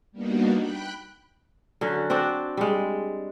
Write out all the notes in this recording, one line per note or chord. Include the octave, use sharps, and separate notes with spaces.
G3 A#3 B3 D4 D#4 F#4
G5 B5 F#6
D3 F#3 C#4
C4 D4 F#4 D5
G3 G#3